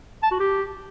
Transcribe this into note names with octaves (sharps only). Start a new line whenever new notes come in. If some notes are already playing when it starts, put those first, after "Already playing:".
A5
F#4
G4